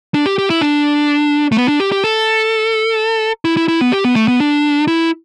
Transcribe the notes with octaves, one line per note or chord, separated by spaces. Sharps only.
D4
G4
G4
E4
D4
A3
B3
D4
G4
G4
A4
E4
E4
E4
B3
G4
B3
A3
B3
D4
E4